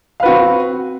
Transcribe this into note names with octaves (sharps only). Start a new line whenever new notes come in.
C4 F#4 B4 F5